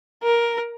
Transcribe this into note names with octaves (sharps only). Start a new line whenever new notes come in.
A#4